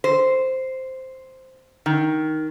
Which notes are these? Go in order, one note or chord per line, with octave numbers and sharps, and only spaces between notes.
C5
D#3